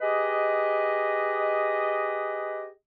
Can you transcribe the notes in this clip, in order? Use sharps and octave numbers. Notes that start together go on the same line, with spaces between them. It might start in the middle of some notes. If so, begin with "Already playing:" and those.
G4 G#4 B4 D#5